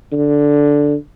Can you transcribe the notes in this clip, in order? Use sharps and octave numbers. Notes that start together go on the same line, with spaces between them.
D3